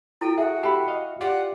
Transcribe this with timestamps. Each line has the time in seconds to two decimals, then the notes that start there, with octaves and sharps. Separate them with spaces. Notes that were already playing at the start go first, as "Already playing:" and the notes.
0.21 E4 A4 G5
0.38 F#4 G#4 E5
0.63 G4 A4 E5 G5 B5
0.88 D#5 F5
1.21 F4 G4 D5 F#5